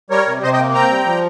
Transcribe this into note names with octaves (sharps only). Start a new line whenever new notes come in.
G3 A#4 C#5
C3
C3 C5 D#5
D#5 G5
A#3
C4 G5 A#5
G3
F3